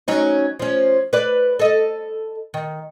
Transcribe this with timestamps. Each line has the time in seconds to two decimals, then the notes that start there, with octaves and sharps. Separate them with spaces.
0.08 F#3 C#4 D#4
0.59 F3 C#4
1.13 B4 D5
1.59 A4 D#5
2.54 D#3